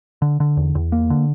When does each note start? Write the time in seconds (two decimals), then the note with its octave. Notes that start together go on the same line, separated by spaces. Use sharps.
0.22 D3
0.40 D3
0.57 E2
0.75 E2
0.92 A#3
1.10 D3